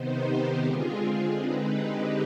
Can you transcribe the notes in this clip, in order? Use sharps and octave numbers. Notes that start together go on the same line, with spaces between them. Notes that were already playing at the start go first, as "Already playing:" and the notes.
Already playing: C3 D#3 B3 D#4 C5
G4
D3 G#3 C4 F4 G#4
D3 G#3 C4 D#4 B4
G4